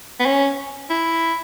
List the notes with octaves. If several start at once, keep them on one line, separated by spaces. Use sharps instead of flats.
B3
C#4
E4